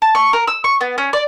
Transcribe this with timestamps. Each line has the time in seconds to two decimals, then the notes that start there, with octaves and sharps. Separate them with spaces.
0.02 A5
0.15 C#6
0.33 A#4
0.47 E6
0.64 C#6
0.81 B3
0.98 C#4
1.13 D5